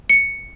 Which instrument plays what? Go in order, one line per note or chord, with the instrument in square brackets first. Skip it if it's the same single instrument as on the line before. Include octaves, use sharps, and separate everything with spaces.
[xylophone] C#7